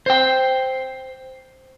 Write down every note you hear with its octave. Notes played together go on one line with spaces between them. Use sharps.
C5 G5